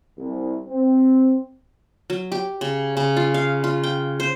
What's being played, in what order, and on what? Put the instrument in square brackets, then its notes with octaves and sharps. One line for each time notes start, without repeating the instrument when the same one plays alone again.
[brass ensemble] C2
C4
[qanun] F#3
G4
C#3
C#3
F4
F5
F4
G5
C5